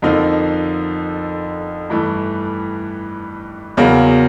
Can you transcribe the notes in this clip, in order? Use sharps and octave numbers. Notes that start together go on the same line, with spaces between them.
F2 D3 F3 A#3 D#4
G2 E3 A3
E2 C#3 F#3 A#3